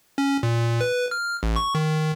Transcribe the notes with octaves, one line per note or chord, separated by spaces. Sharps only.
C#4
A#2
B4
F6
A1
C#6
D#3